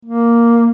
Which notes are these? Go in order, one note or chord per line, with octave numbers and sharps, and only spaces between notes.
A#3